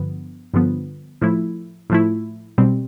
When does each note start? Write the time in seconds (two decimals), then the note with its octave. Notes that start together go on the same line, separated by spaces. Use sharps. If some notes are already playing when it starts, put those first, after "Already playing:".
Already playing: G2 D3 F3 B3
0.54 G2 D3 F3 B3
1.21 A2 F3 A3 E4
1.90 A2 F3 A3 E4
2.58 B1 B2 G3 C4